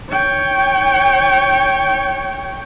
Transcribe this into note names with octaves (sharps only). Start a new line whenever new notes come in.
C#5 G5